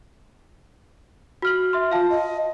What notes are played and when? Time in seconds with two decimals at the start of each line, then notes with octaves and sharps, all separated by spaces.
1.42 F#4 F6 F#7
1.73 E5 C6
1.92 F4 F5 A5
2.10 D#5